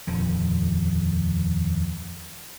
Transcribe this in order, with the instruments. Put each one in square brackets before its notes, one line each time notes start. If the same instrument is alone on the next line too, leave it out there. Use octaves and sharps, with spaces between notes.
[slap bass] D#1 F2 D3